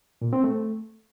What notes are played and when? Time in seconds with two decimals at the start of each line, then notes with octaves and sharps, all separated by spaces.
0.21 A#2
0.33 C4
0.44 A3